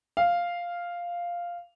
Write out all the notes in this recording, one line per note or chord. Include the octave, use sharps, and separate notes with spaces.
F5